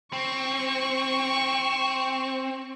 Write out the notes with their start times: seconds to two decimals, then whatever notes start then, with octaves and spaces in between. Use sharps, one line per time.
0.13 C4 C#6